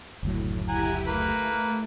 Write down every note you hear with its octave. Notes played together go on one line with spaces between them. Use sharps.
F#1 D2 A2 F#3
E4 G4 F#5 G#5 A#5
A3 A#3 B4 A#5